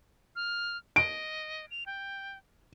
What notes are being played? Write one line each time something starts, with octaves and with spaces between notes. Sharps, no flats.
F6
D#5 D7
F7
G5